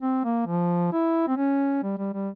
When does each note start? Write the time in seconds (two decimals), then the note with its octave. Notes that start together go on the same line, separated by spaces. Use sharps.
0.02 C4
0.25 A#3
0.47 F3
0.92 E4
1.28 C4
1.37 C#4
1.83 G3
1.98 G3
2.13 G3